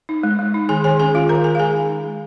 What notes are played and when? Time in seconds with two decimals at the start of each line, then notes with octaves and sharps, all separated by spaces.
0.09 D#4
0.23 G#3
0.39 G#3
0.54 D#4
0.69 D#3 G#4 G#5
0.84 D#3 G#4 G#5
0.99 C#4 G#4 G#5
1.15 F4 F5
1.29 D#3 A#4 A#5
1.44 D#3 G#4 G#5
1.55 F5
1.59 G#3 G#4 G#5
1.75 D#4
1.89 D#4
2.05 G#3